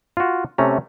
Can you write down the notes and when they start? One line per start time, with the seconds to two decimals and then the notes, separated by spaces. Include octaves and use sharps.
0.17 F4 F#4
0.58 C3 A3 C#4 A#5